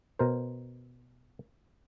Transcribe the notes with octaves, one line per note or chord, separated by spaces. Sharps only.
B2 A#4 C5